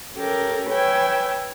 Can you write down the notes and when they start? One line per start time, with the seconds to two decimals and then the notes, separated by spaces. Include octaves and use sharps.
0.16 C#4 G4 A4 A#4
0.69 B4 C#5 G5 G#5 E6